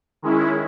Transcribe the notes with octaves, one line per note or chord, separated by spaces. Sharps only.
D#3 G#3 C#4 E4